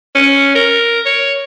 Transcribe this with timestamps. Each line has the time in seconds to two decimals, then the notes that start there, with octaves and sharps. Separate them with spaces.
0.15 C#4
0.55 A#4
1.06 C#5